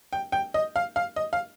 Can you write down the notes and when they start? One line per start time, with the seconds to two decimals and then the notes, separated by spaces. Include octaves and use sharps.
0.13 G5
0.32 G5
0.54 D#5
0.76 F5
0.96 F5
1.16 D#5
1.33 F5